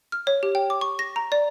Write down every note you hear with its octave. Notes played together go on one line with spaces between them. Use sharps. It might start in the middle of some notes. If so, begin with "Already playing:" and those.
F6
C#5
G4
G5
D6
C#6
A#6
A#5
D5